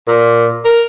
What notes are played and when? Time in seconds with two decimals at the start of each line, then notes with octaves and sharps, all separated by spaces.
0.07 A#2
0.65 A#4